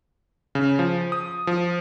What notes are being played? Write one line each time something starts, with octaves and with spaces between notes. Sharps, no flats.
C#3
F3
D#6
F3